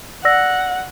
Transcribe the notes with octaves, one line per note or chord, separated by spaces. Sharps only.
D5 F#5 E6 A#6